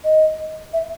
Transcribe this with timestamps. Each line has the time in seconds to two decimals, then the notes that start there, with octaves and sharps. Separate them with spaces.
0.04 D#5
0.73 E5